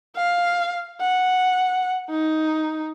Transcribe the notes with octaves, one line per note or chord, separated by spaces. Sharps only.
F5
F#5
D#4